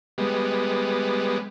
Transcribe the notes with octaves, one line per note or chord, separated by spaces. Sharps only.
G3 G#3 B3